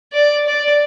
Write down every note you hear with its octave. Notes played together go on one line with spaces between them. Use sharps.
D5
D5